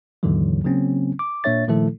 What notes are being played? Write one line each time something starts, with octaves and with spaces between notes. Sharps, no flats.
D#2 G#2 D3 E3 F#3
C#3 F#3 A#3 C4 C#4
D6
A#2 A#3 D4 C#5 E5 A6
A#2 D#3 F3 A3 E4 A4